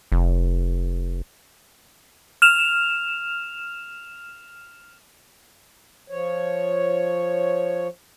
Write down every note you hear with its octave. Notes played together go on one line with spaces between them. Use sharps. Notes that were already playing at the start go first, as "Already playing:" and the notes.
F1
F6 E7 F7
F3 C#5